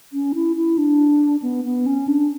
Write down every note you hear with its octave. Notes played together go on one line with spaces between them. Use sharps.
C#4
E4
E4
D4
B3
B3
C#4
D4